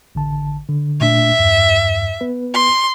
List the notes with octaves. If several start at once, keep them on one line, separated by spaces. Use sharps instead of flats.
A1 D3 A5
D3
A#2 A3 D4 E5
E2 G2
B3 B4
C6